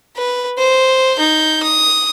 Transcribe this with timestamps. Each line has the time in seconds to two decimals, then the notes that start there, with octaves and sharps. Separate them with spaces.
0.17 B4
0.58 C5
1.16 D#4 G6
1.63 D#6